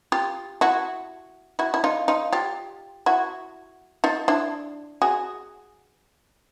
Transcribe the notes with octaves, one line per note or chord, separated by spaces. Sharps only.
F4 G4
E4 F#4
E4 F#4
E4
D#4 F4
D#4 F4
F4 G4
E4 F#4
D#4 F4
D4 E4
F#4 G#4